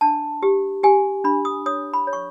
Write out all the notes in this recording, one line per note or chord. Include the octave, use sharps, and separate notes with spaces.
D4 A5
G4
G4 G#5
D4 B5
D#6
C#5 D#6
B5
C#5
C#6